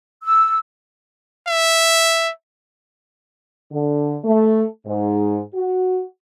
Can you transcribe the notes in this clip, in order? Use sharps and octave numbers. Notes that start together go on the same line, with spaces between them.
E6
E5
D3
A3
G#2
F#4